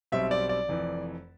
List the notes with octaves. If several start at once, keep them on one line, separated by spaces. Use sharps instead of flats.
B1 B2 G3 C4 E5
D5
D5
F1 F2 E3